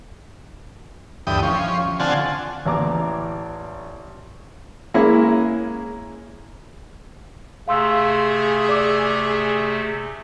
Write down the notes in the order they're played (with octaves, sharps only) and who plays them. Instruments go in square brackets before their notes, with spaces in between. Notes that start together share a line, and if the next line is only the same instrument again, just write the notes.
[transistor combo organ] D2 G2 E3 G5 D#6
F3 C#4
D3 C4 F4 F#5 G#5 A5
[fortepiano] A1 E2 A#5 D6
G#3 A#3 C#4 E4
[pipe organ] C3 A3 [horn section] G#4 [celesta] F5 C6 E6
[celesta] D5 D6 E6